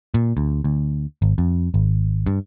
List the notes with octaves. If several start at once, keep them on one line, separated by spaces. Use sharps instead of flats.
A#2
D2
D2
G#1
F2
G#1
G2